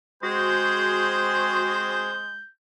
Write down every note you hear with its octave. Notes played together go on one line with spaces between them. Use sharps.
G#3 C4 F#4 G#4 C5 G6